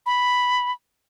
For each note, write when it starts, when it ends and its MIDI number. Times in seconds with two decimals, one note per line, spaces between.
0.06 0.72 83